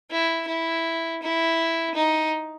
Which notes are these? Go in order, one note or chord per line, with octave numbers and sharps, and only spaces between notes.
E4
E4
E4
D#4